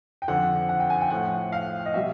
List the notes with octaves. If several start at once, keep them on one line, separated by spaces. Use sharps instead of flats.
G5
F2 D3 F3 F#5
F#5
G5
G#5
G5
A2 F3 F#5
F5
D#5
B2 G3 E5